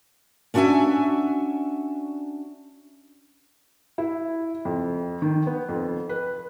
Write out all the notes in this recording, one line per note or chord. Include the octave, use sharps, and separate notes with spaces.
C#4 D4 F#4 C#5 E5 G#5
E4
F2
D#3
B3
F2
B4